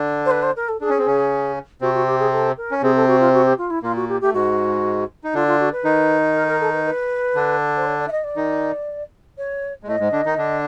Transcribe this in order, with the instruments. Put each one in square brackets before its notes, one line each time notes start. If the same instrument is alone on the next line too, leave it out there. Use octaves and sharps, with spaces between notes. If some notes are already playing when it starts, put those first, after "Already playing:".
Already playing: [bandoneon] D3 D4
[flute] C5
B4
C5
A#4
A4
[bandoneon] D4 [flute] G#4
[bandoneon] C#4
C4
C#3 C#4
[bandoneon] C3 C4 [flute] F#4
[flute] F#4
G4
G#4
A4
A#4
[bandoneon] C#4
[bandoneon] C3 C4 [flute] G#4
[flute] A4
F#4
F4
F#4
G4
F4
E4
[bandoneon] A#2 A#3 [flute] F4
[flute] F#4
G4
[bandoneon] A3 [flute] G4
[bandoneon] G#2 G#3 [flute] F#4
[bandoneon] D#4
[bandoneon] D3 D4 [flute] F4
[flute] F4
F#4
B4
[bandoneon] D#3 D#4
[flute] A#4
A#4
A4
B4
B4
[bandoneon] D3 D4
[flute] C5
C#5
D5
E5
D#5
D5
[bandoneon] D#3 D#4
[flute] C#5
[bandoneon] G#3
[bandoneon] A2 A3 [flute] D#5
[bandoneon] G#2 G#3
D3 D4
D#3 D#4
D3 D4